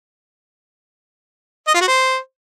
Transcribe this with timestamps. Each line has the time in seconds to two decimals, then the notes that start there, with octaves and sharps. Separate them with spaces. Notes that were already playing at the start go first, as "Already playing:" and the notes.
1.67 D#5
1.74 F4
1.81 F#4
1.88 C5